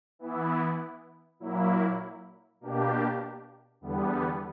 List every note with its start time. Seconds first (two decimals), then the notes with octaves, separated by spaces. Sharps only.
0.19 E3 B3 E4
1.40 A#2 F#3 A#3 E4
2.60 B2 A#3 D4 G4
3.81 E2 D3 G3 B3